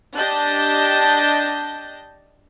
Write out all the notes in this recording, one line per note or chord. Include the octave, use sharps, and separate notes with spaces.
D4 G4 D#5 A5 G6